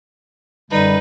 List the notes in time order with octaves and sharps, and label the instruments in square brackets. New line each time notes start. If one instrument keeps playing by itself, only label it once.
[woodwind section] F#2 D3 G3 [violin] D#4 B4